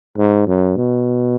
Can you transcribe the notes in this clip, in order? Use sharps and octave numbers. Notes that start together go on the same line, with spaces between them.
G#2
F#2
B2